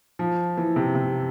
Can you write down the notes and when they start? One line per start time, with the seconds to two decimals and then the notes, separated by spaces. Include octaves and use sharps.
0.19 F3
0.57 E3
0.76 C3
0.95 C3